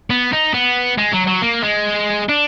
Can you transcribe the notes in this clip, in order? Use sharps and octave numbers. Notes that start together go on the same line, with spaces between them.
B3
D#4
B3
G#3
F#3
F#3
A#3
G#3
D4